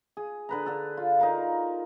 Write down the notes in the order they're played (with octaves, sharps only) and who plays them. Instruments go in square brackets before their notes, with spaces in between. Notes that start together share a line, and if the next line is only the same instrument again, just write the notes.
[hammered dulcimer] G#4
D3 B4 A#5
D3 A4
F4
D#4 A#4 F5